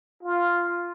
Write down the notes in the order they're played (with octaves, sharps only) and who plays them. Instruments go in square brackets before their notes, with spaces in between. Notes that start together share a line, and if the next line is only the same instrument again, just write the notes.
[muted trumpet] F4